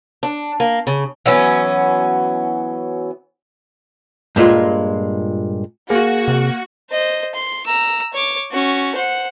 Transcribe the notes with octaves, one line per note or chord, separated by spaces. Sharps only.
D4
A#3
C#3
E3 F#3 B3 C#4
G2 A#2 G#3 F4
A#3 F#4 G#4
C3
C5 D#5
C6
A#5 E6
C#5 D6
C#4 F#4
C5 F#5